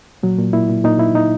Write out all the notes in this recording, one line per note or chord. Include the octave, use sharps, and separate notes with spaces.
A#2 F#3
A#2
A#2 E4
A#2
A#2 D#4
A#2 E4
A#2 D#4